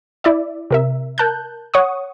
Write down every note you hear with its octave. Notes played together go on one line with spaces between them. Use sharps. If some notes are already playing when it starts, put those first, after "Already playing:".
E4 D5 E5
C3 A#4 E5
A#4 A5 F#6 G6
C#5 F#5 C#6 D#6